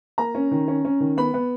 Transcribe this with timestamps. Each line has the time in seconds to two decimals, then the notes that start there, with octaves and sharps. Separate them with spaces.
0.18 A#3 A#5
0.35 C#4
0.51 D#3
0.68 C#4
0.85 C#4
1.00 D#3
1.17 B3 B5
1.34 B3